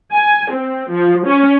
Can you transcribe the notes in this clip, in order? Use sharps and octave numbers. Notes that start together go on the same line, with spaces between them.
G#5
C4
F3
C#4